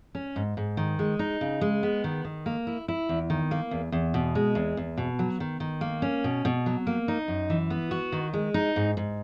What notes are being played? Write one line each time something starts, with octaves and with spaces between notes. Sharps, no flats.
C#4
G#2
G#2
D#3
G#3
D#4
C#3
G#3
B3
D#3
D#3
A#3
E4
E4
E2
D#3
A#3
E2
E2
B2
G#3
E2
E2
B2
F#3
D#3
D#3
A#3
C#4
B2
B2
F#3
A#3
D#4
F#2
E3
B3
F#4
D#3
G#3
D#4
G#2
G#2